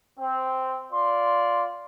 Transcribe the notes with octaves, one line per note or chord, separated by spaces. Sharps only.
C4
F4 D5 C6